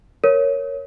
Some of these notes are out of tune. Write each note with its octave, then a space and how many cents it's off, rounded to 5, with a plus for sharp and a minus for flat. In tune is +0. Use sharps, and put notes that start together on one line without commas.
A#4 +0 C#5 +0